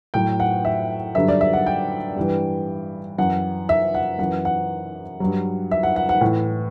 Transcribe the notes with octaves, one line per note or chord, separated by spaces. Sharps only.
A2 F#3 G5
F#5
E5
G2 D3 F#3 E5
D5
E5
F#5
G5
G2 E3
F#2 E3 F#5
E5
F#5
F#2 E3 F#5
F#5
G2 F#3
E5
F#5
F#5
F#5
A2 E3